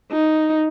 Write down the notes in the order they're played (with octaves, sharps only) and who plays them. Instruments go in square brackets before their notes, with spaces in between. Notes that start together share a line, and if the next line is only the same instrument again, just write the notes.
[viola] D#4